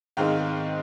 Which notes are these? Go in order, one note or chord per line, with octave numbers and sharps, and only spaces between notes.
G#2 D#3 G#3 C4 F5 G5